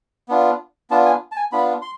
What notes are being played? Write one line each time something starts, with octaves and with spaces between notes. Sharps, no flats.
B3 D4 F4
B3 D4 F4 A5
G#5
A5
G#5
B3 D4 F4 B5
C6